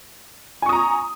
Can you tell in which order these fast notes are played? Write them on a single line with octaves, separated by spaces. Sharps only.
G#5 C#6 D#6 A#5